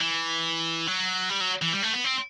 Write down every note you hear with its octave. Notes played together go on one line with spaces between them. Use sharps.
E3
F#3
G3
F#3
E3
G3
A3
B3
C4